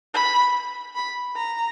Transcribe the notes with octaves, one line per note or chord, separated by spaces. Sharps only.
B5
B5
A#5